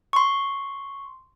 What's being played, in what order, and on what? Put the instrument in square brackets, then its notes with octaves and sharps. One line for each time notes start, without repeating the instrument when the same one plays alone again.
[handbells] C6 C#6